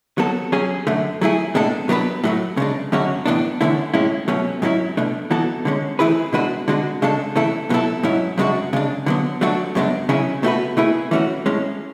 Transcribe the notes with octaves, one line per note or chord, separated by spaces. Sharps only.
F#3 B3 F#4 A4
F#3 C#4 G#4
F#2 D3 A3
F#3 A3 E4 G#4
A2 G#3 B3 D4 A4
F#3 B3 D4 G#4 B4
A2 F#3 A3
C#3 G#3 D4
F#2 D3 G#3 C#4 F#4
A2 E3 B3 D4
E2 D3 A3 C#4 E4
A2 G#3 C#4 E4
B2 F#3 A3 C#4
G#2 F#3 C#4 E4
B2 A3 D4
E3 B3 F#4 A4
D3 G#3 C#4
E3 A3 E4 G#4 B4
B2 G#3 D4 F#4 B4
D3 G#3 D4 F#4
C#3 G#3 D4 A4
C#3 E3 A3 E4 A4
B2 F#3 B3 E4 A4
G#2 F#3 C#4 E4
F#2 C#3 G#3 D4 F#4
C#3 G#3 D4
D3 F#3 B3
F#3 A3 D4 F#4
F#2 C#3 G#3 B3 D4
C#3 F#3 C#4 E4 G#4
B2 A3 C#4 F#4 B4
B2 A3 E4 G#4 B4
E3 A3 C#4 F#4
A2 G#3 C#4